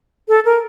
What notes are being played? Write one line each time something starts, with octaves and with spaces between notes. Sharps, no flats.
A4
A#4